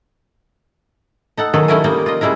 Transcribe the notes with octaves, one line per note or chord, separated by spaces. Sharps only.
D#4 A4 F#5
D#3 F#3 G#4 A4 B4
G3 A3 C#4 E4 A#4 G#5
G3 A#3 D#4 D#5
F4 D#5
C#3 G3 G#3 E4 A#4